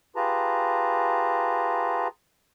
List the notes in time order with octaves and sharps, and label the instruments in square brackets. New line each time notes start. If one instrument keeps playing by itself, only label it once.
[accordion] F4 G4 G#4 B4 A5 A#5